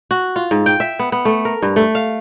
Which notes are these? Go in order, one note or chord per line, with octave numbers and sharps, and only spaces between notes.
F#4
F4
G#2
G5
E5
B3
B3
A3
A#4
G2
A3
F5